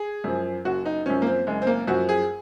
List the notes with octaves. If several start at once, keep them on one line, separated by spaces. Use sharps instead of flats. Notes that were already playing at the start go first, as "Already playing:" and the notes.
Already playing: G#4
F#2 F3
F#1 F#4
D#4
F#2 F3 C#4
A#3
C4
F#1 G#3
C4
A#3
F#2 F3 F#4
G#4